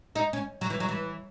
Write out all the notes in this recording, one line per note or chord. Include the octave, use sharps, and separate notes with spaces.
D#4
C#4
F#3
E3
F#3
E3